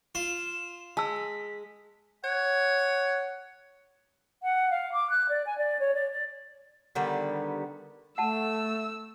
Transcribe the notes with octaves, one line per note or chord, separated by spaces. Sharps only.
F4 E7
G#3 A5 E6 B6
C#5 F#5
F#5
F5
D6
F#6
D5
G#5
D5
C#5
D5
D5
D3 D#3 G3 B3
A3 F#5 A5 E6